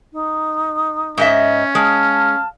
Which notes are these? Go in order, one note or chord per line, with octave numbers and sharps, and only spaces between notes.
D#4
G#2 C#4 D#5 E5
G#3 F5 A5